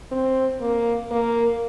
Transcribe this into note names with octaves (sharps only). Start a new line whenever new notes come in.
C4
A#3
A#3